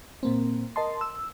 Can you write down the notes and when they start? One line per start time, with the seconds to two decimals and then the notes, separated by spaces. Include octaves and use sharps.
0.23 A#2 A#3 C4
0.76 A#4 D#5 A5 C6
1.01 E6